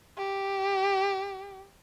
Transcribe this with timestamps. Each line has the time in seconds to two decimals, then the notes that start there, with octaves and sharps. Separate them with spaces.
0.18 G4